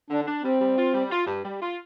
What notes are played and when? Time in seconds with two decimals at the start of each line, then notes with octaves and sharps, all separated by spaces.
0.10 D3 D4
0.27 D4
0.43 G3 C4
0.60 G3
0.77 F4
0.94 G3
1.11 F4
1.27 G2
1.45 G3
1.62 F4